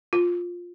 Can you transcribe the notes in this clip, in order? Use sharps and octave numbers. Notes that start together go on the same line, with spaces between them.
F4